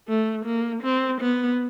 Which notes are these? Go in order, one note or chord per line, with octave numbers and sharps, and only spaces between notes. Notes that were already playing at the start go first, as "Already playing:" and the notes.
A3
A#3
C4
B3